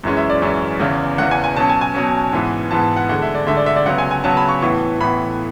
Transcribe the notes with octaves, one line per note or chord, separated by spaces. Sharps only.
F#2 E3 G#3 C#4
E5
D5
F#2 E3 G#3 C#4
E2 C#3 E3
E2 C#3 E3 F#5
G#5
G#5
B2 F#3 C#4 A5
G#5
G#5
B2 F#3 C#4
G#2 E3 B3
G#2 E3 B3 A5
F#5
D2 D3 G#3 F#5
E5
D5
D2 D3 G#3 E5
D5
E5
D5
C#2 C#3 F#3 B3 F#5
G#5
G#5
C#2 C#3 F#3 B3 A5
B5
C#6
A2 E3 B3 C#6
A2 E3 B3 B5